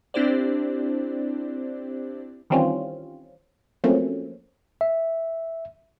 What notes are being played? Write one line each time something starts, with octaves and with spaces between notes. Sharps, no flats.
C4 D4 E4 G4 C5 D5
D#3 E3 G3 C4 C#4 F4
F3 F#3 A3 A#3 C4 C#4
E5